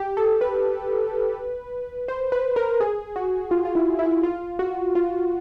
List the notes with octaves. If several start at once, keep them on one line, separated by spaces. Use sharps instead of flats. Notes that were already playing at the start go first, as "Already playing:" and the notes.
Already playing: G4
A4
B4
C5
B4
A#4
G#4
F#4
F4
F4
E4
E4
F4
F#4
F4